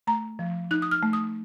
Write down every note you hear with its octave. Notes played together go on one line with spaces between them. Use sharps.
A3 A#5
F3
D#4 F#6
D#6
F6
A3
D#6